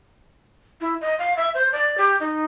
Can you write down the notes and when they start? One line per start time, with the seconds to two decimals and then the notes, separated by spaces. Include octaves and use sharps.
0.81 E4
1.01 D#5
1.19 F5
1.37 E5
1.55 C5
1.72 D5
1.98 G4
2.20 D#4